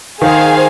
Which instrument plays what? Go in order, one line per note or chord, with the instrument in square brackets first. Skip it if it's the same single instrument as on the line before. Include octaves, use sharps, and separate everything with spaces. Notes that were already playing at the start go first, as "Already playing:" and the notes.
[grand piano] D#3 [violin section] G#4 C5 F5 G#5